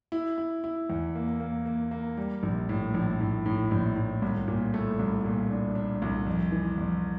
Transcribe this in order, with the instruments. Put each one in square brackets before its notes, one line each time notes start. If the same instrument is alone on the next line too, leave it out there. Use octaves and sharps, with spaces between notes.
[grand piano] E4
E4
E4
E2
A#3
A#3
A#3
A#3
G3
A#1
A2
A#1
A2
A2
A#1
A2
C2
A#2
A3
C2
A#2
D4
D4
C2
F2
E3
F2